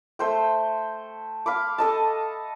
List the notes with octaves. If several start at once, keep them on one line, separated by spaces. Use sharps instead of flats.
A3 C5 G5
F5 B5 D6
A4 D#5 A5